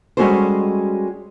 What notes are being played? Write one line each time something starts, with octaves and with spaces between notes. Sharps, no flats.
G3 G#3 C#4 F#4 A4 C5